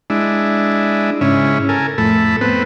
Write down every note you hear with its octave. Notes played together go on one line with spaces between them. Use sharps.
G#3 D4 E4
G#2 C#3 C#4 E4
A4 A#4 G#5
F2 A2 A3 A4 B5
B3 C4 B4